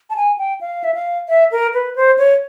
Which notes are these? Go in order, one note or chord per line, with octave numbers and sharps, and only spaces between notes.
A5
G#5
G5
F5
E5
F5
E5
A#4
B4
C5
C#5